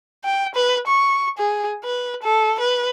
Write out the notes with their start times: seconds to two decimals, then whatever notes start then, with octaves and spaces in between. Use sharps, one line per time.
0.25 G5
0.55 B4
0.87 C#6
1.38 G#4
1.84 B4
2.23 A4
2.60 B4